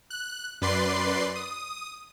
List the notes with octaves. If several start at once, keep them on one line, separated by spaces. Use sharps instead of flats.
F#6
F#2 B4 D5 C6 C7
D#6